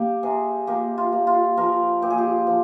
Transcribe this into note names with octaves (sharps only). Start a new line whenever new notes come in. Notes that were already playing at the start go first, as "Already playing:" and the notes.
Already playing: A#3 G4
C3 G#4
A#3 G4
F4
A#3
F4
F3 A#4
A#2 G4
G#4
G4
F3